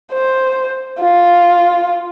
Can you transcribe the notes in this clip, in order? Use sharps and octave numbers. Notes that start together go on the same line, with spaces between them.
C5
F4